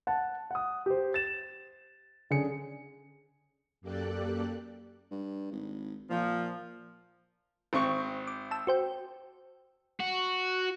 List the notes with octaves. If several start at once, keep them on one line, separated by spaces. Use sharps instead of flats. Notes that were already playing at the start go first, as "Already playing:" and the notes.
F#5 A5
F#5 D#6
G4 C5
A6 E7
D3 C#4 G#4 C#7
F#2 A#3 G4 A4 D5 F#6
G2
G#1
A#2 F3
G#1 C4 C#6
D6
A5 E6
F#4 C5 G5
F#4